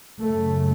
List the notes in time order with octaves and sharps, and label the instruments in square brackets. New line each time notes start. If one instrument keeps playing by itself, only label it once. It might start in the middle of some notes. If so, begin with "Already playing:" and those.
[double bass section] F#2 C#3 A3